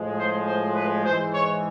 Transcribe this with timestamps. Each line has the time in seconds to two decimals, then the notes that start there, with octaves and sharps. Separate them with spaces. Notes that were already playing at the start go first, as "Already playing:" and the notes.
Already playing: A2 F3 G#3
0.17 C5
0.46 C5
0.75 B4
1.04 G#2 E3 G#3 C5
1.33 C#5